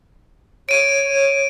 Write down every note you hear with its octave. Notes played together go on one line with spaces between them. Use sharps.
C#5 D7 D#7